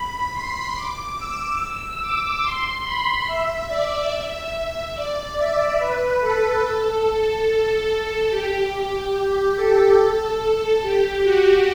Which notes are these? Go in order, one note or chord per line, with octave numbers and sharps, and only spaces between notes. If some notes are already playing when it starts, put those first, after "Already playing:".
Already playing: B5
C6
D6
E6
D6
C6
B5
E5
D5
E5
E5
D5
E5
B4
A4
A4
G4
G4
A4
A4
G4
F#4